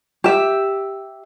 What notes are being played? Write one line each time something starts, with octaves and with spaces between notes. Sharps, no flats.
G4 E5